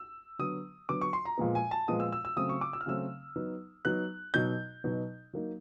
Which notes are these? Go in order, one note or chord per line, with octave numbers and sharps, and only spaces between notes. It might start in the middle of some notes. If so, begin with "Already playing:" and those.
Already playing: E6
D3 F#3 B3 D#6
D3 F#3 B3 D6
C#6
C6
A#5
A#2 F3 G#3 B3
G#5
A5
A#2 F3 G#3 B3 D#6
E6
E6
E6
C#3 F#3 A3 C4 D#6
C#6
D6
E6
F6
C#3 F#3 A3 C4 E6
F#3 B3 D#4
F#3 B3 D#4 F#6
B2 F#3 B3 D#4 G6
B2 F#3 B3 D#4
F#3 A#3 D#4